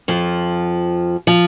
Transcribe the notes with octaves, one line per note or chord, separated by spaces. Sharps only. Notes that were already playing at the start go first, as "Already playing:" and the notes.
F2 F3
F3